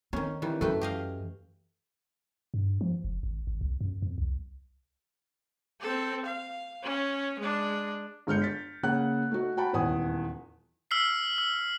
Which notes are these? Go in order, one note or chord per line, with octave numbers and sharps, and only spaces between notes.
D#3 C4 C#4
D#3 E3 G3
F#2 A3 B4 G5
G4 D#5 F5
G2
F3
F#1
G#1
G#1
C2
F#2
F2
C2
C4 A4
F5
C#4
G#3 D4
G1 G#3 F6 G6 C#7
A6 B6
C#3 A#3 F#5 F#6
A3 D#4 F#4
F#4 F#5 G5 A5 B5
D#1 E2 F#5 G#5 D#6
E6 F6 B6 C7
E6